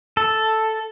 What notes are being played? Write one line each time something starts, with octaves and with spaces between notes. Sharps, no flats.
A4